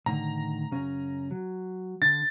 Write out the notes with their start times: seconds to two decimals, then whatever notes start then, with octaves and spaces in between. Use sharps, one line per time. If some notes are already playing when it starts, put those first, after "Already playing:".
0.06 A2 D3 D#3 A#5
0.72 F#2 C#3 C#4
1.31 F#3
2.02 D3 A6